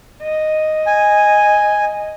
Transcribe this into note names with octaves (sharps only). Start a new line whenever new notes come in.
D#5
G#5